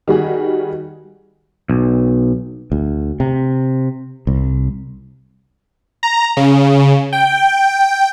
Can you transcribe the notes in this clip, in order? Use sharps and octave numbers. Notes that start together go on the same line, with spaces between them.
D#3 G3 F#4 G#4
B1
D2
C3
C2
A#5
C#3
G5